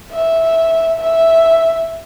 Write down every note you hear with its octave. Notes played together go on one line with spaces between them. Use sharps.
E5
E5